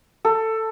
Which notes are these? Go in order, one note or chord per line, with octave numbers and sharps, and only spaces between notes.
A4